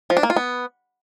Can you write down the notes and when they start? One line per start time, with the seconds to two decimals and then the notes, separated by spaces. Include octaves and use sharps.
0.10 F3
0.17 D4
0.23 A#3
0.30 F4
0.36 B3